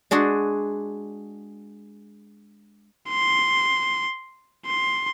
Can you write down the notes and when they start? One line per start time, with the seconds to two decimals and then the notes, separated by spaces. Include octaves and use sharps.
0.11 G#3 D4 F#4 G#4
3.09 C6
4.66 C6